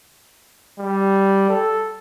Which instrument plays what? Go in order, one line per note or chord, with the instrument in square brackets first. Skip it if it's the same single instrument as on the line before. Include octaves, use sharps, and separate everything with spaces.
[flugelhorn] G3
A4